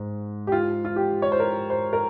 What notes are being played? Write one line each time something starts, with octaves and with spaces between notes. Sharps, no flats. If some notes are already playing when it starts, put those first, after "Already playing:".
Already playing: G#2
G4
F4
F4
G4
C#5
C5
A#4
C5
A#4